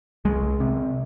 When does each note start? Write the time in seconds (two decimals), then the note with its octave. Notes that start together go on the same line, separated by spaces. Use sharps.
0.25 C2 G#3
0.60 C3